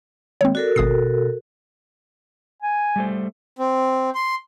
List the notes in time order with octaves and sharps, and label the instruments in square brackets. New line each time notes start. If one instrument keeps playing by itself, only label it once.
[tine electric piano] D#3 G#3 A#3 [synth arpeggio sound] C4 C#5
[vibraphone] F#4 A4 A#4 [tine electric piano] D5
[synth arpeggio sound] G#1 D#6 C7 [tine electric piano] B2
[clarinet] G#5
[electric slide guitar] G3 A3 C5
[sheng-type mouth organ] C4
C6